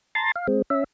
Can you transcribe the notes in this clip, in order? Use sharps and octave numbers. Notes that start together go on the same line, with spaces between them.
A5 A#5 C6 A6
F5
G#3 C4
C#4 E5